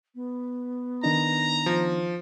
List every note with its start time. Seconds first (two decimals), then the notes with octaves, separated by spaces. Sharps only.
0.15 B3
1.04 D#3 D4 D#4 A#5
1.66 F3